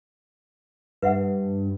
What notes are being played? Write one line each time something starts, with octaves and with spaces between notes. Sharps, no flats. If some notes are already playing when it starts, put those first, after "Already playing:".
G2 B4 E5 F#5